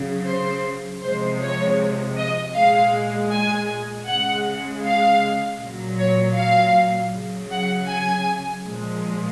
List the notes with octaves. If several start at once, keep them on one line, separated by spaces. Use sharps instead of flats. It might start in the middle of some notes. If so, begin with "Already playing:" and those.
Already playing: C#3 F#3
C5
C3 F3 G#3 C5
C#5
D#5
A#2 G#3 F5
G#5
C#3 G#3 F#5
F5
A#2 F#3
C#5
F5
C#3 F#3
F#5
G#5
A#2 F3 G#3